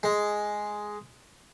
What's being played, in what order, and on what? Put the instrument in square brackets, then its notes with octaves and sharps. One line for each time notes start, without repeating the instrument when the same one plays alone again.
[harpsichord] G#3